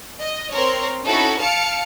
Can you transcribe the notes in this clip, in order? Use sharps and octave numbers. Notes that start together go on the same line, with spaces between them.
D#5
C4 A#4 C#5 C6
C#4 D#4 E4 F#4 A4
F5 A5 F6 C#7 D7